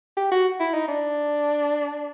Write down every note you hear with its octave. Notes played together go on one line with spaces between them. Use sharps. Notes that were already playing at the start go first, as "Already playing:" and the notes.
G4
F#4
E4
D#4
D4